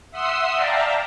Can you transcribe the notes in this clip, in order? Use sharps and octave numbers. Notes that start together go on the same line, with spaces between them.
E5 F#5 C6 D#6 E6 C7
D5 E5 F5 G5 A5 A#5